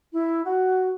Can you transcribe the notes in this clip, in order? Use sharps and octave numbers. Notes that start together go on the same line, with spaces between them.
E4
F#4